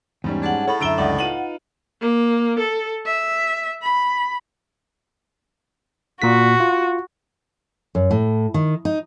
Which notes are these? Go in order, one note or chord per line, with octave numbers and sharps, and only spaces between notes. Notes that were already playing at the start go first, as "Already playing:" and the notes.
E2 G#2 G3 C#4
D4 G#4 F#5
A2 A4 C#5 B5
F#2 D3 E5 A#5 E6 D7 G7
C#2 D5 F#5
D#4 F4 B4 D#7 F#7
A#3
A4
E5
B5
A#2 F#4 B6
F4
F#2
A2
D#3
D#4